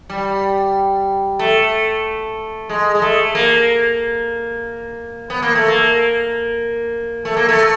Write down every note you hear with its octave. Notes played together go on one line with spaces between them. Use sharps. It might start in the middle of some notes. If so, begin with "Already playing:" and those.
G3
A3
G#3
G#3
A3
A#3
B3
A#3
A3
A#3
A3
A#3
A3